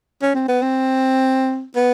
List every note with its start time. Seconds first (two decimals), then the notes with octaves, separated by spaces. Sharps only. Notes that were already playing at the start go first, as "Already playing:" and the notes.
0.22 C#4
0.35 C4
0.48 B3
0.62 C4
1.76 B3